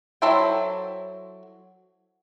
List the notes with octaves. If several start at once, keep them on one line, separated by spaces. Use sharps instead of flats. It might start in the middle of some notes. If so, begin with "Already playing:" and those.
F#3 E4 A4 C5 G5